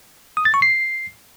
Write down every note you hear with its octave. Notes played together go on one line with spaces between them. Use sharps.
D#6
A6
C#6
C7